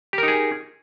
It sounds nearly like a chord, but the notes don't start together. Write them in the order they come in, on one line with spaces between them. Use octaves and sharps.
G4 A#4 D#4 G#4